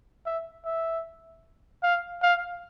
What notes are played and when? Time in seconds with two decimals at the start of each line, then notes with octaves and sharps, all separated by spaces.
0.26 E5
0.65 E5
1.83 F5
2.23 F5